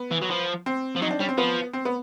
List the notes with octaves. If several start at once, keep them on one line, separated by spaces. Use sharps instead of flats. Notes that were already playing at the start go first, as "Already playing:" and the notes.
Already playing: B3
E3
F#3
F3
C4
F3
F#3 D#4
D4
G3 C#4
C4
F3 B3
C4
B3